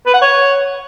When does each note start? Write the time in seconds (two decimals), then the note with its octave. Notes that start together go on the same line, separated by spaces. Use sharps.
0.06 B4
0.14 F#5
0.22 C#5